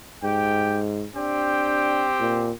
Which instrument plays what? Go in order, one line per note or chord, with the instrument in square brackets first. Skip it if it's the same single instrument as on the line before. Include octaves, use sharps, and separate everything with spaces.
[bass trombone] G#2 [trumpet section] G4 G5
[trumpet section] C4 G4 G5 [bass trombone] D4
[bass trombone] A#2